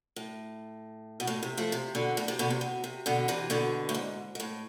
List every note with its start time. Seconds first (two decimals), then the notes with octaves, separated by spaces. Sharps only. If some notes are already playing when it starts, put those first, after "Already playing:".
0.16 A2
1.20 B2
1.27 A2
1.43 C3
1.57 F3 A3
1.72 C3
1.95 B2 D3
2.17 A2
2.28 C3
2.39 B2 D3
2.50 C3
2.61 B2
2.84 C3
3.06 B2 D3
3.28 C3 E3
3.50 B2 D3
3.89 A2
3.94 G#2
4.35 G#2
4.40 A2